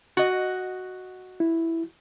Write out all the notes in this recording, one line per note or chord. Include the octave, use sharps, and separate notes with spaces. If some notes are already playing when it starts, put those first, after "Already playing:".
F#4 D#5
E4